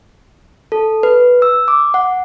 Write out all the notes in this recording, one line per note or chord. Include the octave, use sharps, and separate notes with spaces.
A4
B4
E6
D6
F#5